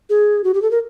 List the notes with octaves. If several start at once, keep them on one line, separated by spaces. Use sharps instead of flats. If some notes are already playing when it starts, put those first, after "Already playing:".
G#4
F#4
G4
A4
A#4